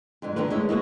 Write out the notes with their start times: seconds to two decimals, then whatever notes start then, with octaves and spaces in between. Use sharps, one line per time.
0.22 F2 G#2 D3
0.36 G2 D3 D#3 E4 A#4 B4
0.50 G#3 A3 C#4 E4
0.69 G#3 A#3 B3 F#4